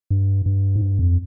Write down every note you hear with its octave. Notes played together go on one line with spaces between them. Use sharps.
G2
G2
G#2
G2
F2